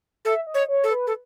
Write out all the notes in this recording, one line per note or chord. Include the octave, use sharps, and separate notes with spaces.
A4 E5
D#5
C#5
C#5
A4
B4
A4